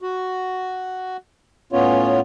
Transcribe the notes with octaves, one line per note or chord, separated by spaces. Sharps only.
F#4
A2 B3 C#4 F4 C#5